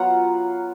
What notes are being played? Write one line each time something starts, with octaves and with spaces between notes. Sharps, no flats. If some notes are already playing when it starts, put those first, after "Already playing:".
Already playing: F#3 B3 F4 F#5 A#5